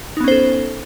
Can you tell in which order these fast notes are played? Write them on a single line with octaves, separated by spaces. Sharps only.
D#4 B3 C#4 C5 A4